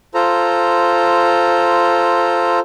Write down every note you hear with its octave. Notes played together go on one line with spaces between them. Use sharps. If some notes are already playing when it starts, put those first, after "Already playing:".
F4 A4 C5 A#5